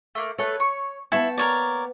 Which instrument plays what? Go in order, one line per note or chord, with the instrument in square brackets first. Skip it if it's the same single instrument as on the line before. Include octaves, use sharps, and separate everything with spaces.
[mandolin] A3 A#3
[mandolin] A3 A4 B4 [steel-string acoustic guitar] C#5
[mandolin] C#6
[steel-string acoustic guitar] A#3 B3 G5 [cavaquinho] E4 [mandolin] A5 C#6
[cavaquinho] A#4 C#5 D5